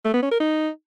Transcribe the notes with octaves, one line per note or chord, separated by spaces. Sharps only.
A3
B3
C#4
A#4
D#4